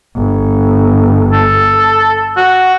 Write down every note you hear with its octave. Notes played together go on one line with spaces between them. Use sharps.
G1
A4
F#4